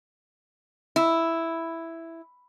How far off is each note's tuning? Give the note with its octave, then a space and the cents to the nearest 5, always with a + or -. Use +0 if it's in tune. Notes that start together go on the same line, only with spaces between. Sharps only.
E4 +0